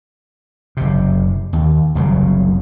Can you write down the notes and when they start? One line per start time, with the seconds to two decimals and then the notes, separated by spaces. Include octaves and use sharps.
0.77 F#1 C3
1.53 D#2
1.95 F#1 C2 C#3 F#3